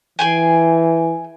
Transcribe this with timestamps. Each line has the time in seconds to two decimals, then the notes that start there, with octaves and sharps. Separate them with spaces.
0.19 E3 G#4 G5 G#5